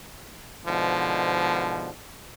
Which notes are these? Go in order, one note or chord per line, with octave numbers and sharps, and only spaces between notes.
G#2 B2 D3 F3